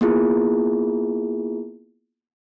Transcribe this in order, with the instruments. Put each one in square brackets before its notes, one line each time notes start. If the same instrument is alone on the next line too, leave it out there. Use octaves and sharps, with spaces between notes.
[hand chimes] A#3 B3 E4 F4 G#4